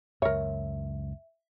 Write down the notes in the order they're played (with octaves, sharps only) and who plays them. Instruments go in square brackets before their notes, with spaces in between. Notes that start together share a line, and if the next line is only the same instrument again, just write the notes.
[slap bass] C#2 F#2 [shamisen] A#4 C#5 [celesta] E5